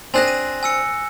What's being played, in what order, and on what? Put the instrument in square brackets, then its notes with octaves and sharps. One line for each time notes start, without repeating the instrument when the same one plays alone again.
[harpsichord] C4 D4 G#4 [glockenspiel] G#5 F#6 A#6
[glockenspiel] D#7
G#5 E6 C#7